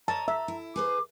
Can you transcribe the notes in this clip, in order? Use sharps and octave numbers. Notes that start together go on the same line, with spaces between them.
C#5 D#5 A5 A#5
A4 E5
E4
G#4 B4 C5 D6